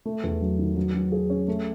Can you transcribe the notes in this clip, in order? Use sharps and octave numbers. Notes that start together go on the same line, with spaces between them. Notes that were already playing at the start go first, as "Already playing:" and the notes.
A3
E2
F#3
D#3
F#3
F#3
G#4
C#4
A3